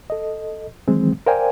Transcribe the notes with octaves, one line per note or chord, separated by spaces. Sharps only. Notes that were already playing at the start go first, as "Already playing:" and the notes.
A4 D#5
D#3 E3 F#3 G#3 C4
A#4 C5 D5 F5 G5 G#5